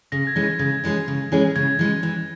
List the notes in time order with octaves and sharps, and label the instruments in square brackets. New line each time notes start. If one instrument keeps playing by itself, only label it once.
[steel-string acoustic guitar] C#3 [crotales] A#6
[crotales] G#6
[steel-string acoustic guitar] E3 G#3 C#4 G#4
[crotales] A#6
[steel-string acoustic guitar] C#3 [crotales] G#6
[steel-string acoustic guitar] E3 G#3 C#4 G#4
C#3
E3 G#3 C#4 G#4
[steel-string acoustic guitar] C#3 [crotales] G#6
[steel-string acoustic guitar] E3 G#3 C#4 G#4
E3